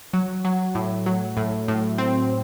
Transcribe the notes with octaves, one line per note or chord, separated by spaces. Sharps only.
F#3
F#3
A2
F#3
A2
A2
C4